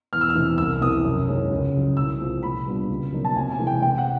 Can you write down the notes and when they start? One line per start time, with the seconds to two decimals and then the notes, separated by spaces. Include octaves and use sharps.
0.13 E2 F6
0.21 E6
0.30 F6
0.35 C3 E3
0.58 C2 E6
0.81 C3 E3 D#6
1.04 F#2
1.28 D#3 G#3 C#4
1.51 C#2
1.73 C#3 F#3
1.97 C2 E6
2.20 C3 F3 G#3 C4
2.43 A#2 B5
2.66 G3 B3 D4 F4
2.89 C#2
3.13 B2 F#3 A#3 D#4
3.25 A5
3.36 C3 G#5
3.52 G#5
3.59 E3 G#3
3.67 G5
3.82 C3 G5
3.98 F#5